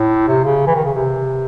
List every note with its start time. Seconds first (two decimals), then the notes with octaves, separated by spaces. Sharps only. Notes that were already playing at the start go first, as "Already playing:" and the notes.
Already playing: A2
0.28 C3
0.44 C#3
0.67 E3
0.75 D#3
0.85 C#3
0.94 C3